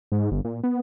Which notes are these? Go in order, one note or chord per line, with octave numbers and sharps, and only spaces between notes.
G#2
G1
A#2
B3